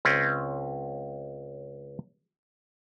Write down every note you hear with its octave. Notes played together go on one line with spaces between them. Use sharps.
C#2 C4 C#4